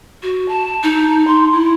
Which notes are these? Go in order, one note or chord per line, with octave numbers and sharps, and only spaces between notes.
F#4
A5
D#4
C6
E4